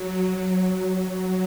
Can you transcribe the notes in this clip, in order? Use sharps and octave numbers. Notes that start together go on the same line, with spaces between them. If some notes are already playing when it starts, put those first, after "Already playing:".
Already playing: F#3